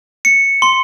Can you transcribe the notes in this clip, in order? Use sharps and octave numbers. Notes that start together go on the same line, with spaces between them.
C#7
C6